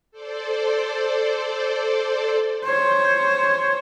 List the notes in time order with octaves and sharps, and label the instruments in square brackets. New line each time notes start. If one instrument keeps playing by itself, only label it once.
[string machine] A4 C5 D5
[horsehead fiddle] C5 C#5